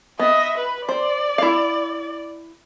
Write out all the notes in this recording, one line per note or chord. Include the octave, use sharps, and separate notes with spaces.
B3 D#5 E5
B4
C5 D5
E4 F5